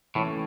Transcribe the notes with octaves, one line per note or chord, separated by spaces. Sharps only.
A2 E3 A3 C#4